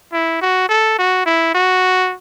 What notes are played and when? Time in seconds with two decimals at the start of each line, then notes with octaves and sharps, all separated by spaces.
0.13 E4
0.42 F#4
0.69 A4
0.99 F#4
1.26 E4
1.54 F#4